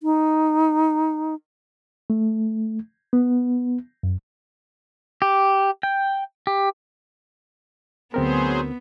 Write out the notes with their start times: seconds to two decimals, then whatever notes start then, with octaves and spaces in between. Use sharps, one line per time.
0.03 D#4
2.10 A3
3.13 B3
4.03 F#2
5.22 G4
5.83 G5
6.47 G4
8.14 D2 F#3 B3 C4 G#4 A#4 C5